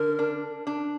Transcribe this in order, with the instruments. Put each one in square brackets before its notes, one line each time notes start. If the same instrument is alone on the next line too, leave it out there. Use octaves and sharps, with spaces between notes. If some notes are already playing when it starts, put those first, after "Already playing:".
Already playing: [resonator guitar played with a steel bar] D3 [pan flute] A#4
[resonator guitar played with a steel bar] D4
D4